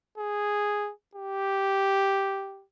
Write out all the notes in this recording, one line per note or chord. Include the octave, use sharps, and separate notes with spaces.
G#4
G4